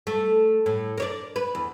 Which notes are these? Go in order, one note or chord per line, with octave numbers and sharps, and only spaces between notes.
A3
A2
A#4 C#5 D5
B4
E2